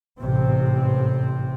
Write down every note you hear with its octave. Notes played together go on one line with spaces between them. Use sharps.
A1 G#2 C3 C4